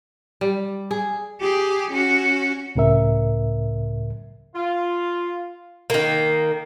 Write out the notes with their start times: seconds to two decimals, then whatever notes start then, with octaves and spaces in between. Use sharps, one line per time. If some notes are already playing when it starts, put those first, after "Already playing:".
0.41 G3
0.91 G#4
1.41 G4 G#4
1.91 C#4 F#4
2.76 C#2 A2 C#3 A#4 E5
4.55 F4
5.90 D#3 A#3